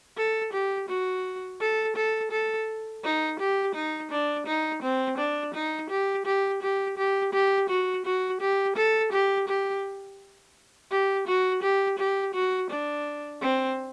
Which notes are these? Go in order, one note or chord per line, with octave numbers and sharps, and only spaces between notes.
A4
G4
F#4
A4
A4
A4
D#4
G4
D#4
D4
D#4
C4
D4
D#4
G4
G4
G4
G4
G4
F#4
F#4
G4
A4
G4
G4
G4
F#4
G4
G4
F#4
D4
C4